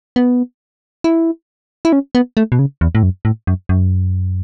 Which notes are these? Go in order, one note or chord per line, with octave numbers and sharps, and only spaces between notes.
B3
E4
E4
C#4
B3
A3
B2
C#3
E2
A2
F#2
A2
F#2
F#2